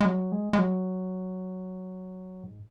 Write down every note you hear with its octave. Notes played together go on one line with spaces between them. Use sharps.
G#3
F#3
G#3
G#3
F#3
G#2